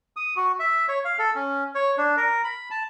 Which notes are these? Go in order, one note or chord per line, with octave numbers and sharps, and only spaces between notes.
D#6
F#4
E5
C#5
F5
A4
C#4
C#5
D4
A#4
B5
A5